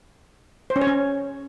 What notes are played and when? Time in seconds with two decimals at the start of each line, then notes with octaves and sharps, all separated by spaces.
0.70 C5
0.76 C#4
0.81 C#5
0.87 C#4